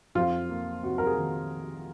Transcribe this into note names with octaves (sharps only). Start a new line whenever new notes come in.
F2 F4
A#3
C3 F#4
A#4
G#4
D#3